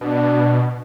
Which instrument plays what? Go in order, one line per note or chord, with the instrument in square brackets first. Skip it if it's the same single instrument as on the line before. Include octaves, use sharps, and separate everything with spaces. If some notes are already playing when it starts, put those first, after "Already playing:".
[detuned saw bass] B2 [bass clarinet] D4